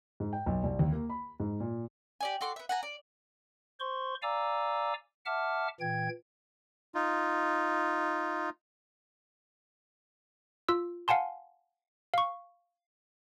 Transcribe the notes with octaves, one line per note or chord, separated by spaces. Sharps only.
G#2
G5
B1
C2
D#2
A#3
B5
G#2
A#2
G4 D5 G#5
F#4 A4 C6 D6
B3 E5
F#5 G#5 A#5
D5
C5 C6 C#6
D5 F5 G#5 A#5 D6 E6
E5 F#5 A5 D6 F6
A#2 E3 G5 G#6
D#4 F4
F4 E6
F5 F#5 G#5 A5 C6
F5 C#6